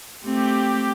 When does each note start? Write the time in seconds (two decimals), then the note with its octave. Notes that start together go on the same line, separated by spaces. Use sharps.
0.24 A3 C4 G4